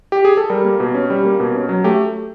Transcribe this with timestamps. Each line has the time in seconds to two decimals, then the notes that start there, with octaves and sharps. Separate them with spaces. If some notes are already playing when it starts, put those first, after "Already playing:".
0.12 G4
0.25 G#4
0.37 A4
0.50 G3 A#4
0.64 A#3
0.80 B2
0.94 C#4
1.10 G3
1.25 A#3
1.40 B2
1.55 C#4
1.69 F#3
1.84 A3 G4